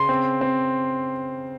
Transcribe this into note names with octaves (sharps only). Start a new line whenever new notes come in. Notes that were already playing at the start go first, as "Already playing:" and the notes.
Already playing: C#3 C6
C4
C4